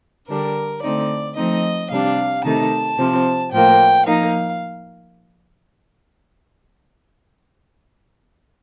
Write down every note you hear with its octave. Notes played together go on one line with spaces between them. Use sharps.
D3 G3 D4 A#4
D3 A3 C4 D#4 D5
F3 A3 C4 D#4 D#5
C3 G3 D4 F5
C3 D#3 A3 D#4 A5
C3 F3 C4
A2 F3 A#3 G5
F3 A#3 D#4 F5